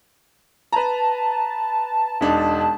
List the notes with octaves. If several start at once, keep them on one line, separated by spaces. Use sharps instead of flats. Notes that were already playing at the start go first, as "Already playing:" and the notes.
B4 A5 A#5
E1 D4 D#4